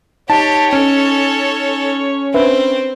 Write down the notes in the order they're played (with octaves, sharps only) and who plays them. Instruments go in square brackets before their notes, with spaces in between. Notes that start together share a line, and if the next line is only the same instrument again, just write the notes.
[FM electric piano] D#4 [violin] G4 [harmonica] C#5 [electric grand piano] A5
[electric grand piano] C#4 [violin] A4
[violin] C4 [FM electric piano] D4 B4 E5